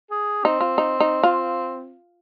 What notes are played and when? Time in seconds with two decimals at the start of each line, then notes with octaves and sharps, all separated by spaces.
0.11 G#4
0.44 C4 D#4
0.61 F4
0.78 D#4
1.00 D#4
1.23 F4